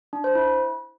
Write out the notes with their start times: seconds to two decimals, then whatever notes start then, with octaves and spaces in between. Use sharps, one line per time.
0.13 D4
0.24 C5
0.35 E4